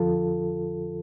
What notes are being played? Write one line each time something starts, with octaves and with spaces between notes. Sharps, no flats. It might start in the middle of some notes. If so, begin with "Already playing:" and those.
Already playing: F2 D3 F3 F4 A4